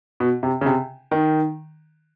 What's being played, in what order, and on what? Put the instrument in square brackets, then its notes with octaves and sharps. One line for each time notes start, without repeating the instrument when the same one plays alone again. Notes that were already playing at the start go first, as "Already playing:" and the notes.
[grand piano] B2
C3
C#3
C3
D#3